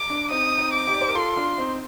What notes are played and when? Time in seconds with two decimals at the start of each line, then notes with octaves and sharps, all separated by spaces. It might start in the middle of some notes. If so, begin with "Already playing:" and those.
Already playing: D6
0.10 D4
0.31 C4 D#4 D#6
0.59 C4 D#4
0.73 D6
0.87 D#4 G4
0.94 D5
1.01 C5
1.09 A#4
1.15 F4 A4 C6
1.36 D4 F4
1.58 C4 D#4